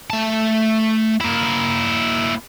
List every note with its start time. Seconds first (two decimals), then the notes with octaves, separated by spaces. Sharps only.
0.10 A3 A5
1.21 A#3 E4